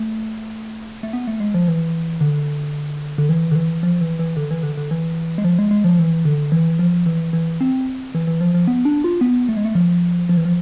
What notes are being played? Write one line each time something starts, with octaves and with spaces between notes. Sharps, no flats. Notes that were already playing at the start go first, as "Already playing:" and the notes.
Already playing: A3
A3
B3
A3
G#3
F3
E3
D3
D3
E3
D3
E3
F3
E3
E3
D3
E3
D3
D3
E3
G#3
F3
G#3
G#3
F3
E3
D3
E3
F3
E3
E3
C4
E3
E3
F3
F3
B3
D4
F4
B3
A3
G#3
A3
F3
F3
E3
F3